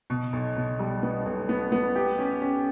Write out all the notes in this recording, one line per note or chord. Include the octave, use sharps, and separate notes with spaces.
B2
B1
B2
G3
B3
B1
B3
B3
G4
C#4
C#4